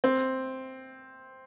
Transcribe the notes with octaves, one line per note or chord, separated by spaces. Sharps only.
C4